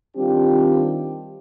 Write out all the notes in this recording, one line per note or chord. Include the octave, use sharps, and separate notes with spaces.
D#3 G3 C4 D4 F4 G4